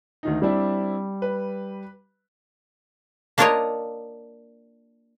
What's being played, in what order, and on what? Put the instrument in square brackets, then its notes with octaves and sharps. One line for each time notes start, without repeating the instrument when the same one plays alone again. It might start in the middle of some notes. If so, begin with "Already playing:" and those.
[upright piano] D2 D#3 D#4
[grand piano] G3 [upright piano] C4 D4 E4
[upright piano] B4
[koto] A#3 D4 F4 A#4 C#5 D#5